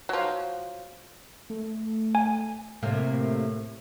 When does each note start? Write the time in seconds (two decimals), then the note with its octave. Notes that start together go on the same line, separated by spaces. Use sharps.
0.09 F3 F#3
1.50 A3
2.15 G#5
2.83 A2 C3 A#3